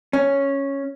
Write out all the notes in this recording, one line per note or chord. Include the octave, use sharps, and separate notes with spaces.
C#4